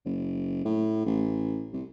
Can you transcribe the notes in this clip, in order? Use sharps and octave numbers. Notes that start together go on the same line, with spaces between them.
F#1
A2
A1
C2